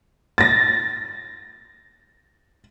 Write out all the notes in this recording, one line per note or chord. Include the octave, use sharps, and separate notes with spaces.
A6 A#6